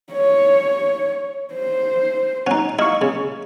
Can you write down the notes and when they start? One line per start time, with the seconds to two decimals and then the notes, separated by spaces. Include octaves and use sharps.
0.12 C#5
1.53 C5
2.47 C#4 D#4 F#5
2.79 E4 D#5 F5 C#6
3.02 C#3